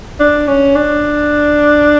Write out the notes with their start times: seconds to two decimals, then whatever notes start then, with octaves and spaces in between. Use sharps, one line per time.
0.20 D4
0.48 C#4
0.75 D4